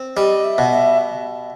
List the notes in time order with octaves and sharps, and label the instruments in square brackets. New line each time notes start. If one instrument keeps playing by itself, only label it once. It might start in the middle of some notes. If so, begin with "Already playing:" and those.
Already playing: [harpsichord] C4
[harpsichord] G3 [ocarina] D#5
[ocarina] E5
[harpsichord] B2
[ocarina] E5